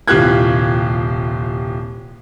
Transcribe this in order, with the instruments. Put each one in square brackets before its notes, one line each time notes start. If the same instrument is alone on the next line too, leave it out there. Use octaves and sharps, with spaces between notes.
[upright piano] D#1 C2 F4 G4 F#6 G#6